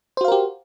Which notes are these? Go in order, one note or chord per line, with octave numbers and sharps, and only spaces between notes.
F#4 G4 A#4 C5 F5